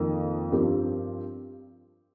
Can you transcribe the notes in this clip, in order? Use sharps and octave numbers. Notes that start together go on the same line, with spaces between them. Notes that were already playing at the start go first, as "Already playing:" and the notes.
Already playing: F2 D#3 A#3
G2 F3 C4 G4 A#4